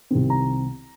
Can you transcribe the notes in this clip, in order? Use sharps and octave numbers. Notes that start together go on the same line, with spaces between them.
C2 C3 D#3 C4
A#5